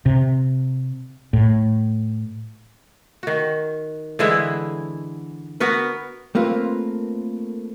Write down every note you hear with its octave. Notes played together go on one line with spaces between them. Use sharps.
C3
A2
D#3 F#4
D3 E3 G#3 E4
B3 F#4 A#4 B4
A3 A#3 C4 F4 B4